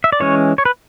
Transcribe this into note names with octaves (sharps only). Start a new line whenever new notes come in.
E5
D5
E3 G#3 C#4 C#5
C#5
B4